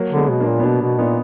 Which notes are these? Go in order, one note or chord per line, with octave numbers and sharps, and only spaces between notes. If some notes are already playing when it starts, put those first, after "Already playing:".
Already playing: F#3 A#3
D3
G#3 B3
B2
A#3 D4
A#2
B3
B2 A#3 D4
B2
A#2 B3 D#4